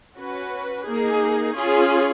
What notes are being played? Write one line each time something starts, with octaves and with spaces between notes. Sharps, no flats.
C#4 F#4 B4
A#3 D#4 G#4
C#4 F4 G#4